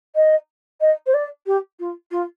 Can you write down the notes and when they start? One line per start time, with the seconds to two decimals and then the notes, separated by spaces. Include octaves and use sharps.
0.15 D#5
0.81 D#5
1.06 C5
1.14 D5
1.46 G4
1.79 F4
2.11 F4